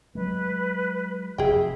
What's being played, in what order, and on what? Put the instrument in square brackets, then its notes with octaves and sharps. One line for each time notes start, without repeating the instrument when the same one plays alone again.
[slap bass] F#3 G#3 [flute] B4
[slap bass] F1 [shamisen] G#4 G5 [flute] E5